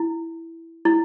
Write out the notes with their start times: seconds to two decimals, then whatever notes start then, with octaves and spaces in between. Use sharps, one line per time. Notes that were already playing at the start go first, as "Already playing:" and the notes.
Already playing: E4
0.85 E4